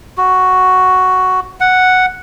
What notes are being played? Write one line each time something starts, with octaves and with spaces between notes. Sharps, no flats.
F#4
F#5